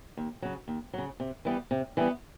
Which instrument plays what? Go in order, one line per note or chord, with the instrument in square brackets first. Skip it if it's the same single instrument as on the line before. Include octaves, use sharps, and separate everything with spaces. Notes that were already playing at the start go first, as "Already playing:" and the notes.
[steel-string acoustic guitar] D#2
C#3 F#3
D#2
C#3 F#3
C3
E3 G3 B3
C3
E3 G3 B3